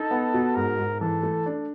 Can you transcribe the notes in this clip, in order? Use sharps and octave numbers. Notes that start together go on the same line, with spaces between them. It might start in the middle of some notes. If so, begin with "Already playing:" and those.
Already playing: D#4 A4
B3
B2
G#2 A#4
G#2
E3 A4
A3
D4